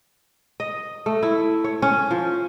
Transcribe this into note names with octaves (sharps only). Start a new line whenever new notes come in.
D#5
A3
E4
C#5
C#4
F3